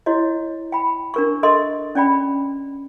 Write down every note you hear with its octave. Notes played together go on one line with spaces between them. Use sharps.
E4 F#4 C#5 D#5
G5 B5
D4 A#4 C#6
A4 A#4 D#5 C6
C#4 D5 G5 B5